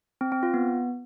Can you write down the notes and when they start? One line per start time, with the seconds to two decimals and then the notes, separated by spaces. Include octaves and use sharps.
0.21 C4
0.32 C4
0.43 F4
0.54 B3